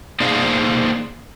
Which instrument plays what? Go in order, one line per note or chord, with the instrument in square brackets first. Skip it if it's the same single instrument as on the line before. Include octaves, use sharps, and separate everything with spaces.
[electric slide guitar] A#3 D#4 G#4 C5 D5 F5